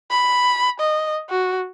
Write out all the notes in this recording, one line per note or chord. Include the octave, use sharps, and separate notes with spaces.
B5
D#5
F#4